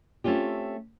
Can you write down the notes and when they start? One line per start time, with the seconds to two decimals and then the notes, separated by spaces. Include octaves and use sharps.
0.24 A3 C4 C#4 F4 G4